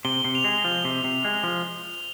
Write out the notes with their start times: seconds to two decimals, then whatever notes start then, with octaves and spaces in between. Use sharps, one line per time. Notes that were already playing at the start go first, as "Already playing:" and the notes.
0.05 C3 G7
0.24 C3
0.35 F7
0.44 G#3
0.64 F3
0.85 C3
1.04 C3
1.25 G#3
1.44 F3